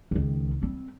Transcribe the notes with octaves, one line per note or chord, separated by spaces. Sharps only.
C#2 D#3
G3 C4